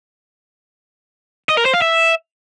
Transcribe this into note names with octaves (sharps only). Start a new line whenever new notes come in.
D#5
A#4
C5
F5
E5